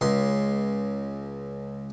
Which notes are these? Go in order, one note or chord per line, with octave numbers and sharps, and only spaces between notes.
C#2 C6